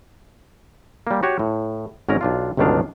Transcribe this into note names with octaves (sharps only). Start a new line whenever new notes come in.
G3 A#3
F#4 G4 C#5 F#5
A2
G#1 G#2 C#4 D#4 A#4 A#5
B1 D4 F4
G1 C#2 B2 D#3 D4 F5